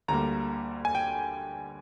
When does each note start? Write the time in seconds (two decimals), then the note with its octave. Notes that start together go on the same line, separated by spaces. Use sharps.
0.08 D2 D3 G3 A#3 A#5
0.85 G#5
0.95 G5